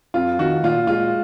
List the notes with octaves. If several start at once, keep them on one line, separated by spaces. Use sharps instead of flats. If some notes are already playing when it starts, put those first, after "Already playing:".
F2 F4
D#3 F#4
A#2 F4
G#3 F4